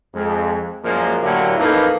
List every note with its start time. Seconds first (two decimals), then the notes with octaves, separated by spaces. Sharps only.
0.14 F2 G#3
0.84 F#2 A#2 F3 G#3 A#3
1.22 A2 D3 F#3 A#3 E4 G4
1.58 A1 F2 A#3 D#4 A4 B4